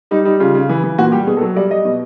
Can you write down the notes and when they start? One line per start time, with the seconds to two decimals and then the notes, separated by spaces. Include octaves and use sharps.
0.11 G3 D#4
0.25 G3 D#4
0.40 C#3 F4
0.55 C#3
0.69 E3
0.84 E3
0.98 A#2 F#4
1.12 G3 G4
1.27 B2 G#4
1.37 A4
1.41 F#3
1.56 G3 D5
1.70 G3 D#5
1.85 B2